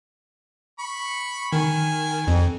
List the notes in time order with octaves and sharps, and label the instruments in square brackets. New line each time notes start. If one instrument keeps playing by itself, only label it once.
[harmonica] B5 C#6
[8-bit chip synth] D#3 [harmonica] G#5
[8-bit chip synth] F2